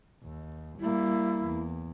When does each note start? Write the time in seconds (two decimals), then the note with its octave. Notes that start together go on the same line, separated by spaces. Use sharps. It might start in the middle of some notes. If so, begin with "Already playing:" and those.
0.23 D#2
0.79 G3 A#3 E4
1.45 E2